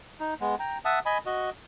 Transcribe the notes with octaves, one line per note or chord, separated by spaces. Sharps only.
D#4
G#3 B3
G5 A#5
E5 F#5 A5 D#6
D#5 G#5 B5
F#4 D#5